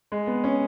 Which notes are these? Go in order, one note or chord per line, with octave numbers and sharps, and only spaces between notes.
G#3
B3
C#4